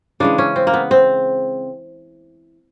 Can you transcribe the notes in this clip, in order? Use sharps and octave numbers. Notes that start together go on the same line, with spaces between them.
C#3 E3 G#3 D4
C#4
C4
A#3
B3
C4